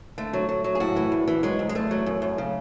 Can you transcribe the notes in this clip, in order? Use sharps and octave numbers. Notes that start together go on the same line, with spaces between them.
D3 A3
F#3
F#3
F#3
G#4
A2 F#4
E3
E2
E3
F#3 G#3
D2
G#3
E2 A3
F#3
F#2
F#2
C#3